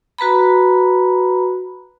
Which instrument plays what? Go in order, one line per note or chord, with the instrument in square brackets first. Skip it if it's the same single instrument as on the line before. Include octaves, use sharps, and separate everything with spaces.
[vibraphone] F#4 B4 A#5 B5